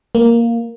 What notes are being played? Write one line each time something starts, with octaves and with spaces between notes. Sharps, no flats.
A#3